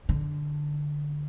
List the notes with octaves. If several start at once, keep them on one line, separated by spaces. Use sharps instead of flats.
D3